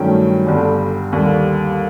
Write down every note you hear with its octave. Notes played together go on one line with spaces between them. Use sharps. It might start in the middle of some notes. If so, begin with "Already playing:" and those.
Already playing: G2 D#3 F#3 A3 C#4 G5
G1 G2 D3 G3
D#2 D3 G3